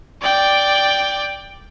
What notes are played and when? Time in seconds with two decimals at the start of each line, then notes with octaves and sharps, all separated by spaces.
0.22 D5 G5